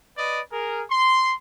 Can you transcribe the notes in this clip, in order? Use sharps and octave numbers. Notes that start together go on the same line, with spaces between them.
B4 D5 D#5
G#4 A#4
C6